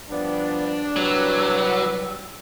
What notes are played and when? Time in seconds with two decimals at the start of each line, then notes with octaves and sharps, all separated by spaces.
0.10 F3 G3 B3 D4 D5
0.96 C2 F#3 G3 B4 E6